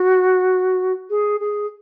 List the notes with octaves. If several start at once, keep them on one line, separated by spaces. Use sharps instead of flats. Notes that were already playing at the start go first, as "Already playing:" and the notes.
Already playing: F#4
G#4
G#4